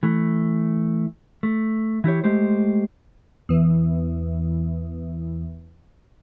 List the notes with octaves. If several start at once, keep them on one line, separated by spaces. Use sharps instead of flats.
E3 A3
A3
E3 E4 G4 C#5
G#3 A3 G4 C5
E2 E3